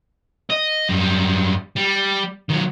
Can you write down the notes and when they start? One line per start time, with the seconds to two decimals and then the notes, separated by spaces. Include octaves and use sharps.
0.50 D#5
0.89 F#2 G3
1.76 G3
2.50 D#3 F#3